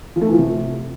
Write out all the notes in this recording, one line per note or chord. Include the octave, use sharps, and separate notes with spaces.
F3
A3
E3
F3
C3